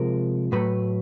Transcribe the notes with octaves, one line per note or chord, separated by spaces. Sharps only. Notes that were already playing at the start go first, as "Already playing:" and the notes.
Already playing: C3 F3 G#3 A#4
A2 F#3 A3 B4